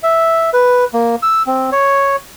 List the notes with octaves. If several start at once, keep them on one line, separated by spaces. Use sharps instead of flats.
E5
B4
A#3
E6
C4
C#5